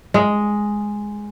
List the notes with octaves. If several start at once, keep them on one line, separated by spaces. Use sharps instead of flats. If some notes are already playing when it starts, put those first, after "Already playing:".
G#3